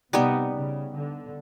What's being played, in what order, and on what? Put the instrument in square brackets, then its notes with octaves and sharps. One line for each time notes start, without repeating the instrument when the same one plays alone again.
[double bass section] C3 [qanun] G3 B3 D#4
[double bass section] C#3
D3